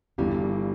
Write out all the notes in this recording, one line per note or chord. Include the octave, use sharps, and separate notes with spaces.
G1 G2 E3 G3